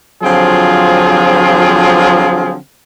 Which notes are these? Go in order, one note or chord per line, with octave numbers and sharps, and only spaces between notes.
D3 F3 F#3 C4 F4 G#4